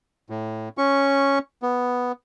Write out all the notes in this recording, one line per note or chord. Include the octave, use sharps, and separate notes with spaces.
A2
C#4 C#6
B3